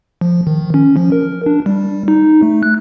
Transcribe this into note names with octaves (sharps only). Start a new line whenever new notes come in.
F3
D#3
C#4
F3
A#4
D4
G3
D#4
A3
F#6